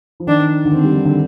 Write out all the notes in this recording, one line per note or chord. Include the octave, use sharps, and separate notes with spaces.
F3
D#3 D4
D3
D#3 C4
G3
D#3
D3